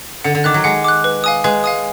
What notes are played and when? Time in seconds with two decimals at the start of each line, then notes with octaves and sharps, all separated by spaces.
0.24 D3 F#5
0.35 D3
0.44 D#3 D6 F#6
0.54 F#3
0.64 G#3 F#5
0.84 D6 F#6
1.04 B4
1.24 F5 G#5 D#6
1.44 G#3 B4
1.64 F5 G#5 D#6